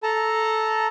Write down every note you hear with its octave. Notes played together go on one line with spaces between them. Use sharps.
A4 A5 A#5